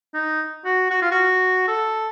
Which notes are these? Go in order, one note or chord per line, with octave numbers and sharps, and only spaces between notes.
D#4
F#4
F#4
F4
F#4
A4